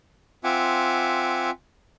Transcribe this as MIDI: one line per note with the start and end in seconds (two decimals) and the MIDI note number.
0.44 1.50 60
0.44 1.50 65
0.44 1.50 76
0.44 1.50 78
0.44 1.50 80
0.44 1.50 86